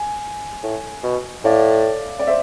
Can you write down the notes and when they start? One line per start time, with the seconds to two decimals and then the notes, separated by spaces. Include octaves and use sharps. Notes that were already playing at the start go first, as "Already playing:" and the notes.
Already playing: G#5
0.63 A2
1.03 B2
1.44 A2 D5 F5
2.19 D5
2.27 C5 E5